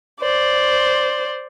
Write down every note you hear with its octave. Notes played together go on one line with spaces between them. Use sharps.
C5 D5